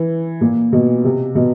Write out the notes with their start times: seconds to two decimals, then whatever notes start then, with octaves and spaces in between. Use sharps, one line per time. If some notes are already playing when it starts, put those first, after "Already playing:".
Already playing: E3
0.41 A#2
0.73 B2
1.04 C3
1.35 B2